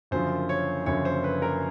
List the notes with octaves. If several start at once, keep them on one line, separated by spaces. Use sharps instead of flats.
F#1 F#2 D3 F3 C5
C#5
F#1 F#2 D3 F3 C#5
C5
B4
A#4